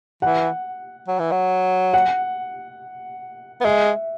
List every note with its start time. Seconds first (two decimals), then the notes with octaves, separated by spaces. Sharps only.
0.22 E3 F#5
1.08 F#3
1.19 E3
1.32 F#3
1.94 F#5
3.61 B3
3.65 G#3 E5